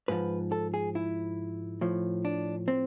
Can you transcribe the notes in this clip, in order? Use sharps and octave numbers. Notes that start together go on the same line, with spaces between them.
G#2 F3 B4
A4
G#4
E4
A2 F3
D4
C4